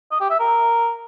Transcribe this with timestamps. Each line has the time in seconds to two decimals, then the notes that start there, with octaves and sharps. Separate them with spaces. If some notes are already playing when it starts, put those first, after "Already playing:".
0.11 D#5
0.20 G4
0.30 E5
0.39 A#4